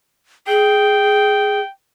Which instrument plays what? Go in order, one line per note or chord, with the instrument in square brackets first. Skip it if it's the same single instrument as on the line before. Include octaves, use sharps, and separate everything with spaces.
[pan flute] G#4 [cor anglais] G5